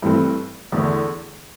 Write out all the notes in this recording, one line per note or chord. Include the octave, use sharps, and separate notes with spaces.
G2 E3 A3 C4
E2 D3 A3